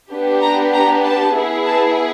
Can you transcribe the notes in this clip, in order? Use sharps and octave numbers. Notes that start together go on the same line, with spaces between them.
B3 D4 G4
A#5
A#5
A5
B3 E4 G#4
A5